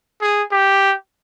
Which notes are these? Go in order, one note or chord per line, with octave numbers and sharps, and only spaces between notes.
G#4
G4